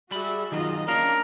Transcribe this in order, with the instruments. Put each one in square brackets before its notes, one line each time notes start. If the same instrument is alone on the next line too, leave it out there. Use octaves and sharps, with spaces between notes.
[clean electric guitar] G3 B5 [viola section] F#4 G#4 E5
[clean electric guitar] D#3 F#3 [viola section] F4 D#5
[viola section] A#3 D4 [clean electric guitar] C#4 F5 [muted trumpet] A#4